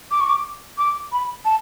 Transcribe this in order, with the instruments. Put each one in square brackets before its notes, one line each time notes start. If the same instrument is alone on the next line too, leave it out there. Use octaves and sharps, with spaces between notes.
[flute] D6
C#6
D6
D6
B5
A5